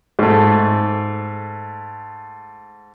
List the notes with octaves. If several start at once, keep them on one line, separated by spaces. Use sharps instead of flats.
G#2 A3